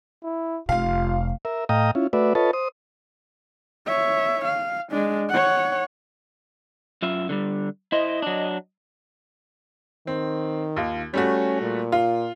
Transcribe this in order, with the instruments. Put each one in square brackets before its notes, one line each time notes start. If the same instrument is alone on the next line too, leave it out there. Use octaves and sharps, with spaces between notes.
[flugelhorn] E4
[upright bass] F1 C3 [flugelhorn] F4 [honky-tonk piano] F5
[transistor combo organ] A#4 E5
A2 D#5 F5 G5 A#5 D#6
C#4 E4 F4
A3 F#4 B4 D5 E5
F4 A4 B4 C#5 D#5 A5
C5 D#6
[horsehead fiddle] C#5 E5
F5
G#3 D4
C#5 F#5
[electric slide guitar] F#2 F4 E5
D3 F3 G3
[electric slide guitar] E4 C5 [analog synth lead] D#5
[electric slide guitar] F#3 D4
[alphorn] D#3 [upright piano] C4
[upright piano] D#2 F4
[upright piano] G3 A3 F#4 [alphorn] C#4
[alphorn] A#2
[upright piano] F4